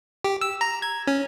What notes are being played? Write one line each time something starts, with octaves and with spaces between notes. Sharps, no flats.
G4
E6
A#5
G#6
C#4